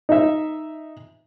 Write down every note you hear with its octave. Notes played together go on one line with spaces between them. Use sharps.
D#4 E5